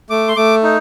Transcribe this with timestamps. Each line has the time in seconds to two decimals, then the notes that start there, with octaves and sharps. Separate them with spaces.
0.10 A3 D6
0.28 C6
0.37 A3 D6
0.63 D#4